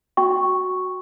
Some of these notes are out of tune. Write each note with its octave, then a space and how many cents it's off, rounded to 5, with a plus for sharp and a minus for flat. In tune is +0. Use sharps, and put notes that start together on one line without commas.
F#4 +0 G5 +0 C#6 +0